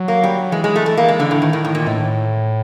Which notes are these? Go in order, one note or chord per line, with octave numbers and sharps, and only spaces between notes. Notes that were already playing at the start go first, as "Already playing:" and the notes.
Already playing: F#3
A#3
G3
E3 G#3
G#3
A3
A3
A#3
G#3
D3
A2
A2 D#3
A2
A2
A#2
A2 E3